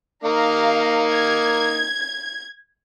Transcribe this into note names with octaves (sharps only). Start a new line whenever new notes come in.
A#3 D#4 F5 A#5
G#6